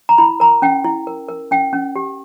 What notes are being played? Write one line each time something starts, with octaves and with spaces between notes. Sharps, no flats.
A#5
E4 B5
A#4 A#5
C#4 G5
E4
A#4
A#4
C#4 G5
C#4
G4